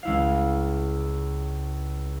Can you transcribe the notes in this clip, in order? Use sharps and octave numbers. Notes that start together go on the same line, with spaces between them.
C#2 E4 F5